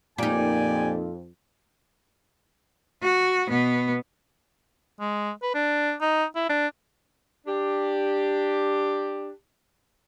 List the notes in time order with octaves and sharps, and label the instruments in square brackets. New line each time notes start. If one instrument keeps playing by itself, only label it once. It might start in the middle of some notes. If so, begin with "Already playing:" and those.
[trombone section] F2 [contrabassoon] A#2 [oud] A#3 D#4 [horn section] G4 D5 G#5
[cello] F#4
B2 B3
[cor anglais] G#3
B4
D4
D#4
E4
D4
[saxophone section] D4 G4